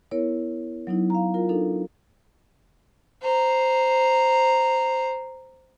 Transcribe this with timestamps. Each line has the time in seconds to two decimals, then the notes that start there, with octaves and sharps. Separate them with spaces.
0.11 B3 E4 A#4 C#5
0.87 F#3 B3 D#4 E4
1.10 F5 A#5
1.34 F4 A#4
1.49 D4 D#4 A4 A#4
3.22 C5 A#5